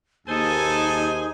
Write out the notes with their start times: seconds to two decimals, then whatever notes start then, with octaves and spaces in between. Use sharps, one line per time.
0.27 D#2 D#4 G#4 A4 C5 G#5